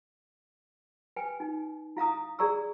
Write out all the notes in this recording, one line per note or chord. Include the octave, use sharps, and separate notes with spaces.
B4 G5 G#5
D#4
E4 F5 A#5 D#6
G#4 D5 A#5 C#6 E6